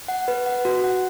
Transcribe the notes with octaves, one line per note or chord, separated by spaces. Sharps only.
F#5
B4
F#5
F#4
F#5